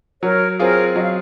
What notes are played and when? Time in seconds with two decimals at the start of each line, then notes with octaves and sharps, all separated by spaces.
0.22 F#3 A#4 C#5
0.59 C4 F4 G#4 A#4 C#5
0.96 F#3 D#5
1.03 F5